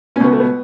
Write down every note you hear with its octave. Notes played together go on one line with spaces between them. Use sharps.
C#2 B2 B3 C#4
A3
B2 B3